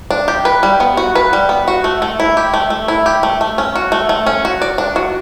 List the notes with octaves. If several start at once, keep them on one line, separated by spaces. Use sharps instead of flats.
D4
G4
B4
G3
B3
F#4
B4
G3
B3
F#4
A3
A3
E4
G4
A3
A3
E4
G4
A3
A3
C#4
F#4
A3
A3
C#4
F#4
D5
D4
F#4